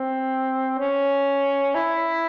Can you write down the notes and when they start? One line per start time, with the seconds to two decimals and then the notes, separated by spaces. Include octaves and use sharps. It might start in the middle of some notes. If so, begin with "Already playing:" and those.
Already playing: C4
0.79 C#4
1.75 E4